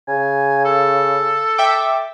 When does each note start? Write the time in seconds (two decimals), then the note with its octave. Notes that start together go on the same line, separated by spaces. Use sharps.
0.08 C#3 G#5
0.65 A4
1.58 E5 G5 D6